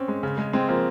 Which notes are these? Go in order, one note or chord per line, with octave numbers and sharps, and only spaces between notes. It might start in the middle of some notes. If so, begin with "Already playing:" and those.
Already playing: C4 C#4
G#3
C#3
G#3
G#3 C4
F3 A#3